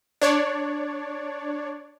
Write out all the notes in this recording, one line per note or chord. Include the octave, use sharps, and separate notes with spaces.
D4 C#5 D5